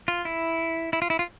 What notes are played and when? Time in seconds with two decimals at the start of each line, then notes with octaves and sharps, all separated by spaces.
0.08 F4
0.25 E4
0.93 E4
1.02 F4
1.10 E4
1.19 F4